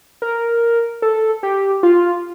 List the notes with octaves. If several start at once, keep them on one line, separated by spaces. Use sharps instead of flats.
A#4
A4
G4
F4